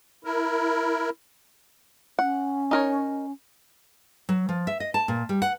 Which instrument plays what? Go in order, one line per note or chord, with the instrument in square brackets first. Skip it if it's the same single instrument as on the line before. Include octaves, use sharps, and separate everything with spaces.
[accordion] E4 A#4
[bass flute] C#4 [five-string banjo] F#5
[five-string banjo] D#4 A#4 C#5
[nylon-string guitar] F#3
F3
E5
D#5
A5
A#2
G3
F#5